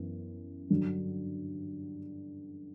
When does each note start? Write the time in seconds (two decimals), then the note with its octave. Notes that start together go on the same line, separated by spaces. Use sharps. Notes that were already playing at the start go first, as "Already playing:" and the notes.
Already playing: F#2 E3 B3 E4
0.70 G2 D3 F#3